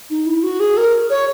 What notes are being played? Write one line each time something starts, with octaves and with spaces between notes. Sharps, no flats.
D#4
E4
F#4
G#4
A#4
C#5